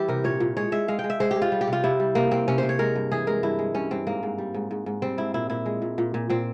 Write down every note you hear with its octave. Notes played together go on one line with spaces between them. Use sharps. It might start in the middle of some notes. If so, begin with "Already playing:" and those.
Already playing: E3 G3 E4 G4
C3 A#4
A#2 C#5
A#2
G#3 C#5
G#3 E5
G#3 F5
G5
G#3
E5
G#3 C5
G4
G#3
F4
G3
G4
C3
F4
C3 E4
G3
C3 A#3
C3 C4
C3 C#4
C3 C5
C#5
G#3 A#4
G2
E3 G#4
G#3 A#4
G2 E4
G#3
G2 C#4
G2 C4
G#2 A#3
G#2
G3
G#2
G#2
G#2
G3 C4
G#2 E4
A#2 E4
A#2 E4
G#3
A#2
A#2
A#2
A#2 C4